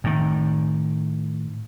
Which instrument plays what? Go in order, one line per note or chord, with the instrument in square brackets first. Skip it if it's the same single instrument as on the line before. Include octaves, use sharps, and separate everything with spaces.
[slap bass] A2 D#3